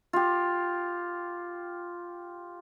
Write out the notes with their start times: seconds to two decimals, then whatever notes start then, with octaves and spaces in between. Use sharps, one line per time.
0.13 F4 G4